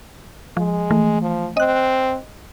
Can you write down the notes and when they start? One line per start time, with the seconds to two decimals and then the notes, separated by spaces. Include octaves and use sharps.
0.57 F3 G#3
0.91 E3 A3
1.22 F3
1.57 C4 D#5 F#6